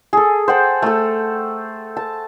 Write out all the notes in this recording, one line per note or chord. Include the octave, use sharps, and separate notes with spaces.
G#4 A4
C5 F#5 G5 A5
A3 A4
A5